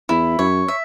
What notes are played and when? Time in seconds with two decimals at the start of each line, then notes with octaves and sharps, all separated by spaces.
0.09 E2 E4
0.39 F#2 C#5
0.68 E5